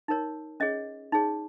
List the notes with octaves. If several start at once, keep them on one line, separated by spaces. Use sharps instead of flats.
D#4 A#4 C#5
C#4 G#4 C#5 D#5
D#4 G#4 C#5